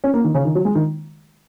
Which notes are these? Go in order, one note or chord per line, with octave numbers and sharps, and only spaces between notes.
C#4
A#3
D#3
C#3
D#3
F#3
G#3
D#3